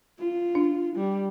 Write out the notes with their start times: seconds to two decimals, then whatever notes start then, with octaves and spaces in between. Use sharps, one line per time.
0.19 F4
0.55 D4
0.96 G3